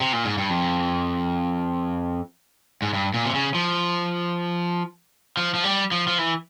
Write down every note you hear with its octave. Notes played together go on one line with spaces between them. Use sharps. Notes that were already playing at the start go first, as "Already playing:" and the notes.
C3
A#2
G#2
G2
F2
G#2
G2
A#2
C3
C#3
F3
F3
F3
G3
F3
F3
E3